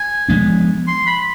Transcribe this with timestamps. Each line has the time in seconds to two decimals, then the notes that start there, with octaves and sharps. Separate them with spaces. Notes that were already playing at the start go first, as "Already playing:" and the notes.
Already playing: G#5
0.29 F3 G#3 B3 D4
0.88 C6
1.07 B5